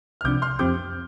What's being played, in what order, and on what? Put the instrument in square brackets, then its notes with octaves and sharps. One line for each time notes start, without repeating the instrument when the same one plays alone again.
[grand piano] F6
[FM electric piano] C2 C3 F3 D4 [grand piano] D6 G6
[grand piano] C6 F6
[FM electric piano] F2 F3 C4 G4 [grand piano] D6 G6